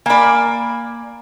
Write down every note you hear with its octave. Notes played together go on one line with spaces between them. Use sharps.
A#3 D5 G#5 B5